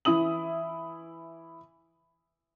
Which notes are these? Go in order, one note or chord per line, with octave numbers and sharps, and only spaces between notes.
E3 E4 E5 D#6 F#7